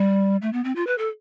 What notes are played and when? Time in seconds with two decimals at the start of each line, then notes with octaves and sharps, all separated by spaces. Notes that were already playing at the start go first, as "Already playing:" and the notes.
Already playing: G3
0.42 A3
0.53 B3
0.64 C4
0.76 F4
0.87 B4
0.98 A4